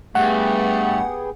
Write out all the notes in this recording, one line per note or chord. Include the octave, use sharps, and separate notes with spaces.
G2 A3 B3 G4 G#4 F#5